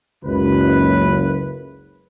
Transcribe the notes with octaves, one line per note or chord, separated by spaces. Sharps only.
F#1 C#2 B4